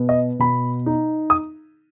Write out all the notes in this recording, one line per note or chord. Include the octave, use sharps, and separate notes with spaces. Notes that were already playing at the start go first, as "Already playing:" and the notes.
Already playing: B2 B3
D#5
B2 B5
D#4
D#6